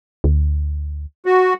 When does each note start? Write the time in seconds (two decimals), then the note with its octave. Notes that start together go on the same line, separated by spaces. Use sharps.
0.24 D2
1.26 F#4